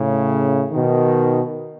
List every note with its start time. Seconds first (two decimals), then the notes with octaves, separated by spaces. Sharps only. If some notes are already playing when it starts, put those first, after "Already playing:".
Already playing: A2 C#3
0.71 B2 D#3